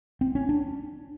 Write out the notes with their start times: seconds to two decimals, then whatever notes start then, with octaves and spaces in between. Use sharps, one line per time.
0.21 C4
0.35 C#4
0.49 D4